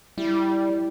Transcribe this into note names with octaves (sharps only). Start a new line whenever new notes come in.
G3 E4 G4